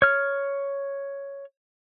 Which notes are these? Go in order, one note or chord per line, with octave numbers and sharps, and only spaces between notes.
C#5 F6